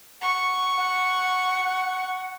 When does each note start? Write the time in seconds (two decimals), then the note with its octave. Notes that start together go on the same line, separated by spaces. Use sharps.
0.21 F#5 C#6
0.76 F#5